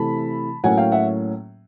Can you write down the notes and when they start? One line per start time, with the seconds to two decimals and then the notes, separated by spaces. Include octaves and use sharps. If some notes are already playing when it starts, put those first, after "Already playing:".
Already playing: C3 E3 A3 A5 B5
0.64 A2 F#3 A#3 C#4 F#5 G#5
0.77 F5 G5
0.92 E5 F#5